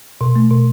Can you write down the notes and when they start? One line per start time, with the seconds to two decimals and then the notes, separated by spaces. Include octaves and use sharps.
0.21 B2
0.36 A3
0.51 B2